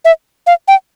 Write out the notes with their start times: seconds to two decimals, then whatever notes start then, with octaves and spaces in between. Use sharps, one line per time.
0.05 E5
0.47 F5
0.68 G5